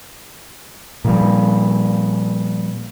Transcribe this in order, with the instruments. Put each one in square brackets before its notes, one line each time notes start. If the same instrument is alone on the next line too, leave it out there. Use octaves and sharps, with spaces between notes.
[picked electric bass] A#2 F3 G3